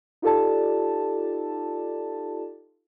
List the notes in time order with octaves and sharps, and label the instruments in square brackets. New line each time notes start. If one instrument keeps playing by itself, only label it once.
[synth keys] D#4 F4 G4 A4 D5 A5